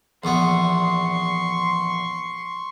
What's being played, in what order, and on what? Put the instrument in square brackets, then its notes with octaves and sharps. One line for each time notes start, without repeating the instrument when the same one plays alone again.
[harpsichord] A#1 E2 B3 [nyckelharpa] C6 C#6